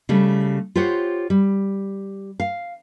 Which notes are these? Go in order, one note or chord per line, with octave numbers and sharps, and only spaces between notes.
C#3 G3 A3
F4 G4 C5 C#5 F#5
G3
F5